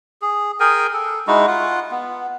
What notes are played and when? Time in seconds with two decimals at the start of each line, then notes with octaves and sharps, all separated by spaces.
0.22 G#4
0.60 G#4 A#4 G5 G#5
0.94 A4
1.27 G#3 D#4 E4 F#4
1.47 F4 F#5
1.91 B3